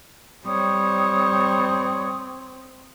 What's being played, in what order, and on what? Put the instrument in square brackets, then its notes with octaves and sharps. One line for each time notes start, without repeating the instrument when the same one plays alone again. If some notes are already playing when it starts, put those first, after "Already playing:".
[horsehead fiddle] G3 C#5 [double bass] C4 [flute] D#6